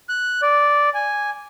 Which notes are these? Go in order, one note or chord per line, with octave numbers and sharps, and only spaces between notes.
F#6
D5
G#5